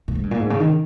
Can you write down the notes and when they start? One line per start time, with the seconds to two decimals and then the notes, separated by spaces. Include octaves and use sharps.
0.08 A#2
0.15 G#2
0.23 G2
0.31 A#2
0.40 G#2
0.50 C#3
0.60 D#3